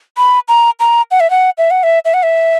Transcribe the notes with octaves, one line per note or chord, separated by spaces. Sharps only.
B5
A#5
A#5
F#5
E5
F#5
E5
F#5
E5
E5
F#5
E5